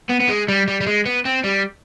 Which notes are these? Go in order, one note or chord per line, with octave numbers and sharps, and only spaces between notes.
B3
B3
G#3
G3
G3
G3
G#3
B3
C4
G3